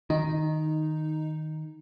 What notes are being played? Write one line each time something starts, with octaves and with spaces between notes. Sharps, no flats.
D#3 D#4